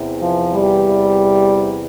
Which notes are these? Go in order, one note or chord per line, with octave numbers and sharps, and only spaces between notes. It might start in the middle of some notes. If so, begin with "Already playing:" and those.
Already playing: E2 C3 E3
F3
G3